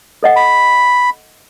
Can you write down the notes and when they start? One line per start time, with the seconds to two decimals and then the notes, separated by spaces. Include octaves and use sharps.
0.23 A4 D#5 F#5
0.36 B5